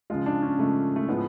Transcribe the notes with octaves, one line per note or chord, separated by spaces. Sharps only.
C#3 F3 G#3 F4
D4
C#4
C#3 F3 G#3 A3
A3
A2 F3 G#3 B3